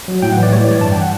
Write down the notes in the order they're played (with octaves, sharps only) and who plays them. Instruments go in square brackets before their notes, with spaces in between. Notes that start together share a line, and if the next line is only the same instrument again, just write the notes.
[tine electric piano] F#3
A2 G5
F#5
E3
D5
G3 C#5
D5
G3
D5
G2 A5
G5
E3 F#5